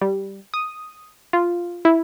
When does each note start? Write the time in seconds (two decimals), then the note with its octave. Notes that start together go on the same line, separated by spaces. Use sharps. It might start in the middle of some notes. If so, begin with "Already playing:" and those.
0.02 G3
0.54 D#6
1.33 F4
1.85 E4